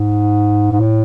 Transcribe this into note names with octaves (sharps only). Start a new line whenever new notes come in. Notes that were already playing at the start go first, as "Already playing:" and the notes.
Already playing: G#2
G#2
A2